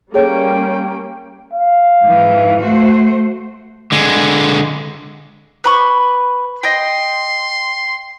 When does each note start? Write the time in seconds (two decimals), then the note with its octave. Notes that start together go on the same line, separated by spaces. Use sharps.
0.14 G3 A#3 C#4 G#4 A4 C#5 G5
1.54 F5
2.02 F2 G#2 E3
2.62 A3 F#4 C5
3.92 D3 G#3
5.64 B4 B5 C#6
6.63 D#5 G5 C6